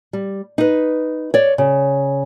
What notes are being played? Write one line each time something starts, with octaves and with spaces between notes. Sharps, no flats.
G3
D#4 B4
C#5 D5
C#3